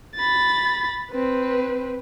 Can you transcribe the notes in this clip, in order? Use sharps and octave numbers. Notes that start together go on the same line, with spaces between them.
B5 A6
C4 B4